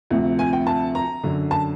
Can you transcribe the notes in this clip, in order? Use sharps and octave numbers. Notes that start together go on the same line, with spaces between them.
D2 C3 F3
G#5
G5
A5
A#5
F#2 D3 F#3
A5